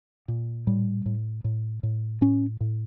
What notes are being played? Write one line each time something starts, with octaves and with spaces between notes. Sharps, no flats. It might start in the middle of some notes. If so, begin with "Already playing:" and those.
A#2
A2 G3
A2
A2
A2
A2 C#4
A2